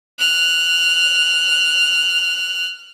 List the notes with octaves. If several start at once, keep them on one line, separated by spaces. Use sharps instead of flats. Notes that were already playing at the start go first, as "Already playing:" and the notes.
F6 F#6